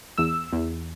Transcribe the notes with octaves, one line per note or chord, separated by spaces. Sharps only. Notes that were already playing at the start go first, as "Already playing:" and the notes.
E2 E6
E2